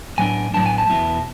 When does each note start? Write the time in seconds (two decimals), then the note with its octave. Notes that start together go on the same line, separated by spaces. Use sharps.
0.18 A2 F#3 B3 D4 G#5
0.54 A2 F#3 B3 D4 A5
0.66 G#5
0.78 A5
0.90 E2 B2 G#3 B3 E4